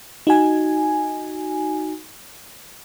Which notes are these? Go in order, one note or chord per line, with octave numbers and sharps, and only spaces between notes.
D#4 F#4 G#5